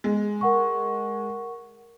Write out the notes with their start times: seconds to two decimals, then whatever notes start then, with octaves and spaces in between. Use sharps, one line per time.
0.04 G#3
0.41 A#4 F#5 C#6